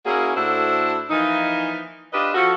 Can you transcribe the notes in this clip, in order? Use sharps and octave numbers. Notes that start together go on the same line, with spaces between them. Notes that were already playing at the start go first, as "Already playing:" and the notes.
A#3 C#4 E4 F#4 G#4
A2 D4 E4 F#4 A4 C5
E3 F3 A#3 D#4
D4 F4 G4 B4 D#5
F3 F#4 A4